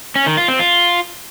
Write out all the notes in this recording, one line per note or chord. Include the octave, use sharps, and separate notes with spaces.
C#4
D#3
F4
C4
F4